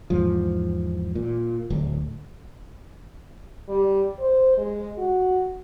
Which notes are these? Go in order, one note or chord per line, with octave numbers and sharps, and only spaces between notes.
E2 G#2 F3
A#2
D1 D2
G3
C5
G#3
F#4